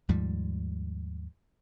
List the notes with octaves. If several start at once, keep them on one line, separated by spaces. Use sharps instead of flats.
D#2 G#2 F3 G3